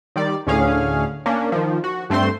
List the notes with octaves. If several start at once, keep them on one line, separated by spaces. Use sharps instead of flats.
D#3 G3 D5
D2 A2 D3 C#4 G#4 F5
A#3 C#4 D4
D#3 F3
F#4
G2 A3 C4 C5 C6